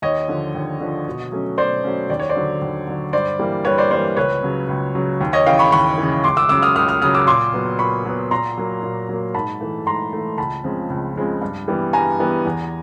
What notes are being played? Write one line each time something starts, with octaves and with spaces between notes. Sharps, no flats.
D#2 C#5 D#5
D3 F3
D#2
D3 F3
B2
F#3 A3 C#4
B2 C5 D5
F#3 A3 C#4
D#2 D5
C#5
C5 D5
D3 F#3
D#2
D3 F#3
G2 C5 D5
E3 G3 A#3
G2 B4 C#5
C5 D5
E3 G3 A#3 C5 D5
C#2 B4 C#5
C#3 F#3
C#2
C#3 F#3
D#2
C#5 D#5
C#3 E3 F5 G5
B5 C#6
D#2 B5 C#6
C#3 E3
C#2 C6 D6
D6 E6
C#3 F#3 D6 E6
D#6 F6
C#2 D#6 F6
D#6 F6
C#3 F#3 D#6 F6
D6 E6
A#2 C6 D6
F#3 B3
A#2 B5 C#6
F#3 B3
A#2 A#5 C6
F#3 A#3
A#2
F#3 A#3
G#2 A5 B5
E3 A3
G#2 A#5 C6
E3 A3
C#2 A5 B5
C#3 F3 G#3 C4
C#2
C#3 F3 G#3 C4
G2
E3 G3 B3
G2 G#5 A#5
E3 G3 B3
E2